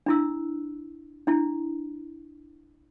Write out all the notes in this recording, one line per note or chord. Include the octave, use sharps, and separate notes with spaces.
D4 E4 E6
D4 E4